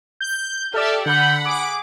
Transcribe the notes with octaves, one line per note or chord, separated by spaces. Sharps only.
G6
G4 A4 D5 E5 F6
D3 F#5 B5 G6
G#4 D6